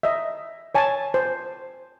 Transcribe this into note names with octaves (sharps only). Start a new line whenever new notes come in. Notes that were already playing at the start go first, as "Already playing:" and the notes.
D#5 E5
C#5 G#5 A5
C5